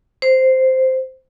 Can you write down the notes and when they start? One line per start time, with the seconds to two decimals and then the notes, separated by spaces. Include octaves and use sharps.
0.22 C5